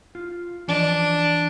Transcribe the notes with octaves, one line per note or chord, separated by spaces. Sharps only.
F4
E3 F3 D4 D#5